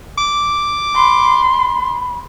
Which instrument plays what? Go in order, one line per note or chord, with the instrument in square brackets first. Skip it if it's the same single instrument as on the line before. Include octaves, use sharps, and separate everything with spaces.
[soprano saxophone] D6
[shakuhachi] B5 [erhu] C6